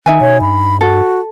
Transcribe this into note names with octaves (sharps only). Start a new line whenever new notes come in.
D#3 D#4 E5 G#5
B2 C#5
G2 B5
F#4 A4